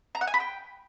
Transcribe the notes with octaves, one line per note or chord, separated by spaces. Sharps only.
A#5
F#5
G#5
B5
G5